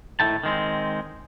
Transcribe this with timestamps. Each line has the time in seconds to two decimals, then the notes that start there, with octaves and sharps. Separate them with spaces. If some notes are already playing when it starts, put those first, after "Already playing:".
0.20 A2 D#3 E4 A4 G5 A5
0.43 D#3 G#3 C4